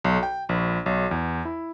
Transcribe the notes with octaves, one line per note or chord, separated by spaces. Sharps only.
B1
G5
A#1
B1
E2
E4